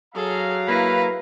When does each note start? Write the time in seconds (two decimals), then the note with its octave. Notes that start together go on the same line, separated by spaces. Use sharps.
0.15 F#3 G#4 A4 F5 A#5
0.68 A#3 E4 B4